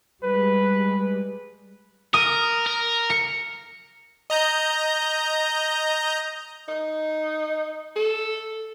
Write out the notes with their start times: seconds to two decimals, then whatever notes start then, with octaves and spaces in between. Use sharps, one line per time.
0.23 G3 G#3 B4
2.14 A#4 D#6
2.66 A#4
3.10 C#7
4.30 D#5 A#5 G6
6.68 D#4
7.96 A4